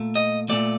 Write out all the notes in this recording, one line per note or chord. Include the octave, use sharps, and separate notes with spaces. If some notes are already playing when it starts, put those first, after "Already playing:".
Already playing: A#2 A3
D#5
A#2 A3 D5